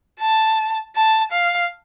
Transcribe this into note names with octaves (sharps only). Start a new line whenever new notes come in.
A5
A5
F5